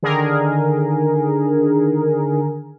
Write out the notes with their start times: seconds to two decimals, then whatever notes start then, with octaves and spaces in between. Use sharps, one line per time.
0.03 D3 D#3 G#4 A#4